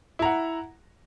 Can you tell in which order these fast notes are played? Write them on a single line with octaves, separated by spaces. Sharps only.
E4 A#5 F#5